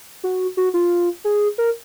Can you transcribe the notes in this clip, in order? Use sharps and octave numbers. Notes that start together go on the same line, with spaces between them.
F#4
F#4
F4
G#4
A#4